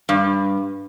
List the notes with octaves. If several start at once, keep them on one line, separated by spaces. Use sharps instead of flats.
G2